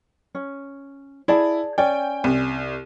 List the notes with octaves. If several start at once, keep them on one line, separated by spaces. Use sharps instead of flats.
C#4
E4 G#4 D5 A5
C#4 D5 G5 G#5
C2